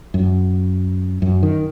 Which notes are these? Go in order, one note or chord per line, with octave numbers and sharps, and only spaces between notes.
F#2
F#2
D#3